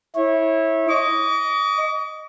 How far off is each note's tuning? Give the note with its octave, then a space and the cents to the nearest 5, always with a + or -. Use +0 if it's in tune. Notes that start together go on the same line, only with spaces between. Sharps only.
E4 -15 C#5 -25
D#5 +0 D6 -45